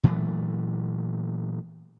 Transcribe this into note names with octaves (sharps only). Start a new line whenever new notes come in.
A#2 E3 F#3 A3